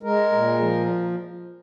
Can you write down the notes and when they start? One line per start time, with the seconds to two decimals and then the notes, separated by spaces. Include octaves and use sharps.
0.03 G#3 A#4
0.32 A#2
0.60 F3